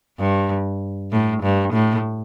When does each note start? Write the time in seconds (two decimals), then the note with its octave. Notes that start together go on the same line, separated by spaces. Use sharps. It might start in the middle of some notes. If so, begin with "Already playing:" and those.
0.19 G2
1.12 A2
1.43 G2
1.73 A2